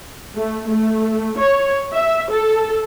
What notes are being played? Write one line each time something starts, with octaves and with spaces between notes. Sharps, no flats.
A3
A3
C#5
E5
A4